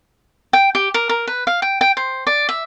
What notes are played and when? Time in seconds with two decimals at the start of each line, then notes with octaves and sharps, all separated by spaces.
0.53 G5
0.75 G4
0.94 A#4
1.09 A#4
1.27 B4
1.47 F5
1.62 G5
1.81 G5
1.97 C5
2.27 D5
2.49 E5